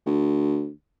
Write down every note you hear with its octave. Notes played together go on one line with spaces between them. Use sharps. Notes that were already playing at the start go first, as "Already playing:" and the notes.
D2